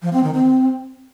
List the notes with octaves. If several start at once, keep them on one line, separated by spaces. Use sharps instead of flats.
F3
C4
D#3
C4